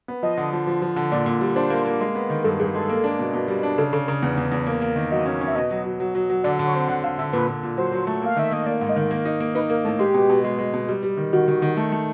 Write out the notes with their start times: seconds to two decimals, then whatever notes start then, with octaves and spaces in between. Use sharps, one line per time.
0.08 B3
0.23 F3 D#5
0.37 D3
0.53 F3
0.67 F3
0.82 F3
0.96 D3
1.12 A#2 D5
1.26 A#2
1.41 G3
1.56 D4 C5
1.70 A#3
1.86 A#3
2.01 G#3
2.15 B3
2.30 D#3
2.44 G2 A4
2.59 G2 G#4
2.74 G#3 A4
2.89 A#3
3.04 D4
3.19 B2
3.33 B2
3.48 G3
3.63 D4
3.78 C#3 A4
3.93 C#3 A4
4.07 C#3 A#4
4.22 E2
4.37 E2
4.52 E2
4.67 A#3
4.82 A#3
4.96 D#3
5.11 F#3 D#5
5.26 C#4
5.41 C#4
5.47 E5
5.55 B2 D#5
5.71 F#3
5.85 F#3
6.00 F#3
6.15 F#3
6.30 F#3
6.44 D3 D5
6.59 D3
6.67 C#5
6.74 C4
6.88 D3 F#5
7.04 D3 F5
7.18 D3 E5
7.33 A#2 B4
7.48 A#2
7.63 A#2
7.77 F#3 C5
7.92 F#3
8.07 A3
8.22 A#3 F5
8.37 D#3 E5
8.51 A#3 D#5
8.66 A#3 D5
8.81 G#2
8.89 D#5
8.96 D#3
9.11 A#3
9.25 D#4
9.40 A#3
9.55 D#4 B4
9.70 A#3 A#4
9.84 A2 A4
9.99 G#3 G4
10.14 B2
10.30 B2
10.44 G#3
10.58 G#3
10.74 B2
10.89 G3
11.03 G3
11.17 D#3
11.33 D#3 F#4
11.48 D#3
11.62 D#3
11.77 A3
11.92 A3